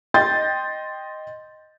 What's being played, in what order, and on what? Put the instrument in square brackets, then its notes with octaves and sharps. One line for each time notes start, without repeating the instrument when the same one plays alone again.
[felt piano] D#5 G5 C6 G6 A6